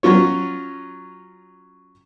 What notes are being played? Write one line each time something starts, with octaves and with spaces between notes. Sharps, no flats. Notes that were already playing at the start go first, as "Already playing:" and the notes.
F#3 C#4 F4 C#5